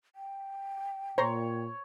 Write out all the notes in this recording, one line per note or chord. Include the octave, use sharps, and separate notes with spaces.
G5
A#2 C5 C#5 A#5 C6